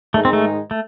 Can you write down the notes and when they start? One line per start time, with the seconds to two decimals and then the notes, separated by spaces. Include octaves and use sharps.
0.14 G#2 D#3 G#3 A3 D#4 G#4
0.25 C4
0.33 A3
0.71 A3